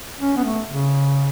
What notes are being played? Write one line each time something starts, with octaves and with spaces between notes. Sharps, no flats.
C#4
B3
A3
C#3